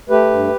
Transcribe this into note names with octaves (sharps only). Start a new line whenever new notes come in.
A3 G4 B4
G2